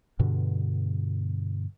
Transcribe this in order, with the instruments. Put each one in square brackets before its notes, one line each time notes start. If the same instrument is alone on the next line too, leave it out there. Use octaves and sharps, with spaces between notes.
[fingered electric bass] G2 B2 D3